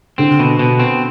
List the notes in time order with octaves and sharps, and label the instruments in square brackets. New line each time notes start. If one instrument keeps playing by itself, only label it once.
[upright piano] D3 [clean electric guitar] C4
[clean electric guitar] B2
B2
C4